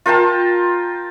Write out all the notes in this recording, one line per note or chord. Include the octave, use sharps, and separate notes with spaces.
F4 A#4 G5 A5